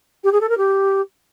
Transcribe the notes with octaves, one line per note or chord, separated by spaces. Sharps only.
G4
G#4
A4
A#4
G4